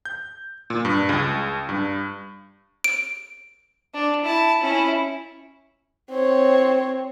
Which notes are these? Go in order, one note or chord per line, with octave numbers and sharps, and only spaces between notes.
G6
A#2
G2
C#2
G2
D7
D4
E4 A5
C#4 E4
C4 C#5